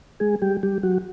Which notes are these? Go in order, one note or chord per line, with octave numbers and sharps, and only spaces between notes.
G#3 G#4
G3 G4
G3 G4
F#3 F#4